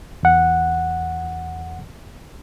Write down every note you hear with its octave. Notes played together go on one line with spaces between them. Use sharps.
E2 F#5